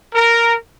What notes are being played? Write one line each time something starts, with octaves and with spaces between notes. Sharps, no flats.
A#4